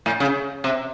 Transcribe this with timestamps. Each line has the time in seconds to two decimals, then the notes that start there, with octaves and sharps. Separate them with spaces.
0.06 A2
0.20 C#3
0.64 C3